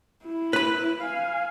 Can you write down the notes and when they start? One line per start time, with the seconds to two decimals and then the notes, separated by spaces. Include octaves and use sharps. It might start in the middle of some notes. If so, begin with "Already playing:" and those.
0.25 E4
0.53 B4 B5
1.02 F5 G#5